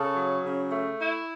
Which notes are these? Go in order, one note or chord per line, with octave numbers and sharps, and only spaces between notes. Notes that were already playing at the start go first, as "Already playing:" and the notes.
Already playing: C#3 A4
F#3
C#3
A3
E4